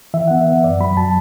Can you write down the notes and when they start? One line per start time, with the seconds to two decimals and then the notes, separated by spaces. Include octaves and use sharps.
0.14 E3 E5
0.28 B3 F#5
0.41 E5
0.47 B3
0.64 F#2 D5
0.80 F#3 B5
0.97 F#3 A5